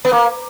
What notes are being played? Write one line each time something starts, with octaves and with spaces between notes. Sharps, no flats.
B3
A#3